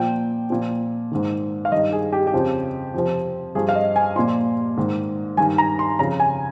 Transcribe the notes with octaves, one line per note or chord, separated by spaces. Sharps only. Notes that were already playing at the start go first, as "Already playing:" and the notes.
Already playing: A#2 F3 G5
A#2 F3
G#2 D#3
F5
G2 D#3 D#5
G#4
G4
G4
F2 C#3 F3
F2 C3 F3
G2 F3 G#4
F5
D#5
G#5
A#2 F3 C6
G#2 D#3
G2 D#3 G#5
A#5
C6
F2 C#3 F3 A#5
G#5